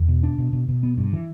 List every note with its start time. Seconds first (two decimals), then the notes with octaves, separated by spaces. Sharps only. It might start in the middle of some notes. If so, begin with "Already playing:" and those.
Already playing: E2
0.08 B2
0.23 D4
0.38 B2
0.53 B2
0.69 B2
0.83 B3
0.98 G2
1.13 E3